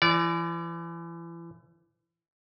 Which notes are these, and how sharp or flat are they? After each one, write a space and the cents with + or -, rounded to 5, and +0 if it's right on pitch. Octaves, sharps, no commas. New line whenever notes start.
E3 +35 D5 -25